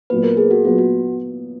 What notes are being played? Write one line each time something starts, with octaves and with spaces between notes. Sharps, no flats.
A#2 F#3 B3 B4
A#4
G#4
F#4
A#2 F#3 B3 F4
F#4